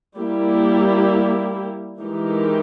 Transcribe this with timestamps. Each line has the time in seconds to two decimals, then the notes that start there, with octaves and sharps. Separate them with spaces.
0.16 G3 A#3 E4 G4
2.00 E3 G#3 D#4 G4 A#4